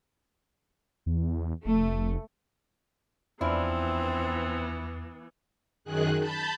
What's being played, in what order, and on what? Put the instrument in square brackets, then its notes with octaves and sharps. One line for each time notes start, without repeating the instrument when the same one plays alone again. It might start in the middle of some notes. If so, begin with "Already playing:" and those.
[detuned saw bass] E2
[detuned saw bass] F1 [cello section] A3
[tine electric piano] E2 [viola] E3 B3 [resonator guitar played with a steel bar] F3 D4 E4 [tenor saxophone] C4
[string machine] F#2 D#3 G#4 F#6
A5 B5 G6 A6